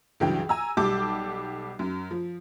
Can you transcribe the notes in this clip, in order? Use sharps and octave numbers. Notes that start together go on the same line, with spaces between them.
C#2 G2 E3 F#3 G5
G#5 A#5 E6
B1 G3 G4 A5 D6 G6
F#2
F3